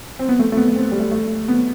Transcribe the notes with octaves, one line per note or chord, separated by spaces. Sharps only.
C4
B3
A3
A3
B3
C4
G3
A3
A3
B3